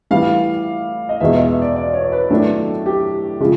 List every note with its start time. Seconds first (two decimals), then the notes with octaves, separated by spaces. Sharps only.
0.11 A2 E3 G3 F5
1.09 D#5
1.20 E2 B2 G#3 E5
1.34 D#5
1.49 E5
1.62 D5
1.76 D5
1.93 C#5
2.12 B4
2.30 A2 F#3 A3 D4 A4
2.86 G4
3.40 C#3 F3 G#3